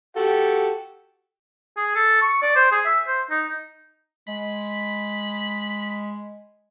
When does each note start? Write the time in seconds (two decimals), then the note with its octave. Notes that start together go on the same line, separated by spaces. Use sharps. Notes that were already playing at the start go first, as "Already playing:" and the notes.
0.17 F#4 G4 A4
1.77 G#4
1.95 A4
2.21 C#6
2.42 D5
2.56 C5
2.72 G#4
2.85 E5
3.07 C5
3.31 D#4
4.28 G#3 B5